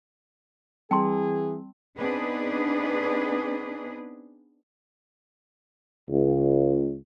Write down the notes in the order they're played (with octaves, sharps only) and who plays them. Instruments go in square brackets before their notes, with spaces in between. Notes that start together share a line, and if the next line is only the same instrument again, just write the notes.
[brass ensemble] E3 G#4 [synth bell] G3 C4 [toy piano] G5 A5 C6
[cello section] B3 C4 D4 D#4 G#4 B4
[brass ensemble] C#2